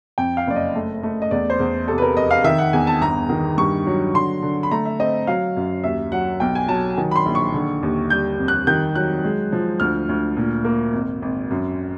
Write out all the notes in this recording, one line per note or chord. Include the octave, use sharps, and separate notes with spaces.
F2 G5
F5
F#1 D5
D#5
A3
A3
D#5
E2 D5
C5
E2
C3 A4
B4
A#4
F2 D#5
F5
D#3 E5
F#5
E2 G#5
A5
G1 A#5
D#3
G2 C#6
F#3
D3 C6
D3
B5
A3 A#5
E5
C4 D#5
F#3 F5
F#2
D#2 E5
F#3 F#5
B1 G5
G#5
F#3 A5
D#3
B5
C6
A#1
C#6
D3
D#2
G3 G6
F2
F#6
D#3 G6
F#3 F#6
G#3
F3
D2 F6
D2
A#2
A#3
G#1
G#1
F#2